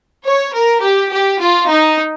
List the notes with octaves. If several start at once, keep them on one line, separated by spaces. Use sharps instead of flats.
C#5
A#4
G4
G4
F4
D#4